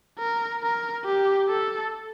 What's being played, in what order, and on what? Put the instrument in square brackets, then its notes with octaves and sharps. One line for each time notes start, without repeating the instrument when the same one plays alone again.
[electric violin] A#4
A#4
G4
A4